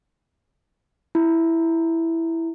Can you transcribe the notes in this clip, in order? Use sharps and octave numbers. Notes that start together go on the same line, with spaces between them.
E4